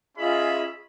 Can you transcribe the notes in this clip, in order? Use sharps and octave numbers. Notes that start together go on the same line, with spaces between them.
C#4 F4 G#4 D#5 E5 B5